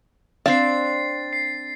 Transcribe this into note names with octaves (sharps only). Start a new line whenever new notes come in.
C4 D4 F5 A6 C7
C7